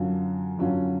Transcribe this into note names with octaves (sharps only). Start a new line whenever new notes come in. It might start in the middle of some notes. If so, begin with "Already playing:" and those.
Already playing: F#2 D3 F#3 C#4 F4
F#2 D3 F#3 C#4 F4